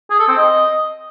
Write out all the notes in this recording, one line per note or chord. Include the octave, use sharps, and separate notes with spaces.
G#4
A4
C4
D#5